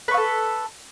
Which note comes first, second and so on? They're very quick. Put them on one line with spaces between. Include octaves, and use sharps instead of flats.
B4 C#6 F5 A4